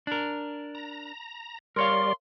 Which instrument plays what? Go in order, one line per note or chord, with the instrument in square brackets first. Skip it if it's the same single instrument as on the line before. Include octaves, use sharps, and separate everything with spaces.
[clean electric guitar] D4 A#4
[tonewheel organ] A#5
[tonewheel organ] G3 D5 [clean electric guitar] A#4 C#5 F5 [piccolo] C6